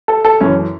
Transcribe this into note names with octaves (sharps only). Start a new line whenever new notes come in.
A4
A4
F#2 E3 C#4